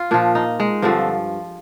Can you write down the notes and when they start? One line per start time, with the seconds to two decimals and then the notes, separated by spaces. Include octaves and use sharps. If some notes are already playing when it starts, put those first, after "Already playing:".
Already playing: F4
0.11 A#2 F3 D4
0.35 D#4
0.60 G#3
0.82 G2 D3 F3 C4